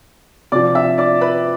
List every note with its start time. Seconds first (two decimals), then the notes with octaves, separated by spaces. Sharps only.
0.52 C3 D5 D6
0.55 F3
0.75 E5 E6
0.98 D5 D6
1.21 B4 B5